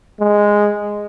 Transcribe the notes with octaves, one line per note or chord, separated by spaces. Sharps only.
G#3